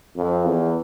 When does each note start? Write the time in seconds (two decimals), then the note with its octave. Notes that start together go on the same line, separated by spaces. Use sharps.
0.16 F2
0.45 E2